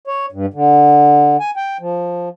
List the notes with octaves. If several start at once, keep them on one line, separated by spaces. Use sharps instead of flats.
C#5
G2
D3
G#5
G5
F3